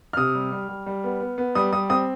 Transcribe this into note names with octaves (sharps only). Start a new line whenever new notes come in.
F6
C3 D#6
G3
G3
G3
G3
B3
B3
B3
G3 D#6
G3 D#6
C4 D#6